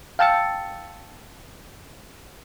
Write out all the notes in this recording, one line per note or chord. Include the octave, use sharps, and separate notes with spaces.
F5 G5 A5 E6 A6 C#7